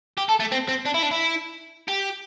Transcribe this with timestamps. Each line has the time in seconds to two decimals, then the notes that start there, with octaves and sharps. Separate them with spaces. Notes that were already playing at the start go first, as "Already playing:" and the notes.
0.18 G4
0.29 A4
0.40 A3
0.52 C4
0.69 C4
0.85 D4
0.94 E4
1.03 D4
1.11 E4
1.88 G4